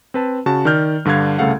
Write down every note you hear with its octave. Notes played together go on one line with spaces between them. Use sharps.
C4 B4 A5
C#3 F#4 A5
D#3 D5 F6 G6
G2 D3 D4 F5 G#6
C2 C#3 A3 A4 F5 F#5